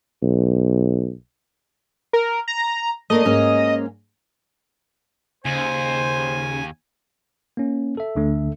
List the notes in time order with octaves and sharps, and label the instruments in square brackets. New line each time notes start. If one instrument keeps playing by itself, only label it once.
[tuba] B1
[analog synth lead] A#4
A#5
[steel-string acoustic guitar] A3 A#3 D4 [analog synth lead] D#5
[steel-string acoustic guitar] G#2 A#3 C#4
[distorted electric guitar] D#2 [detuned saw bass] C#3 [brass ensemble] C5 [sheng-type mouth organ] G#5
[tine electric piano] A#3 C#4
A4 E5
[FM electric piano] D2 D3 A3